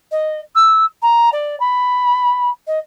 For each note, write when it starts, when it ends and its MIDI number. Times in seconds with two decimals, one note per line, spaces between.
0.11 0.40 75
0.55 0.85 88
1.02 1.29 82
1.33 1.58 74
1.60 2.50 83
2.67 2.79 75